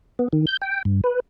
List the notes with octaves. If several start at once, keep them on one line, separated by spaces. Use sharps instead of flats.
B3
D#3
G6
G5
G2
B4